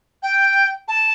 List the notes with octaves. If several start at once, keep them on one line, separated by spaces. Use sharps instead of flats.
G5
A5